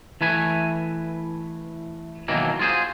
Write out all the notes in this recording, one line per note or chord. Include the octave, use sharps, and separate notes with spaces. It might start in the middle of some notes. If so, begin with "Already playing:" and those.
E3 A3 B4 G#5
B2 D#3 E3 F#3 A#3
F4 F#4 G#4 A#4 C5